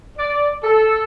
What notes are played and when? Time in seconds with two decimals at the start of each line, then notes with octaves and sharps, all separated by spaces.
0.18 D5
0.64 A4